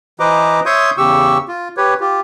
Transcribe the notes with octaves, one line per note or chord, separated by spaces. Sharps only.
E3 B4 C5 D#5 A#5 D6
C#5 E5 C6 C#6 D#6 G6
E2 C#3 G4 C#6 E6
F4
G4 B4 C#5
F4 G4